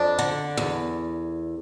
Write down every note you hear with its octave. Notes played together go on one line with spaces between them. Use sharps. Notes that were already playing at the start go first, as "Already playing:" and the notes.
Already playing: F2 D4
D3
E2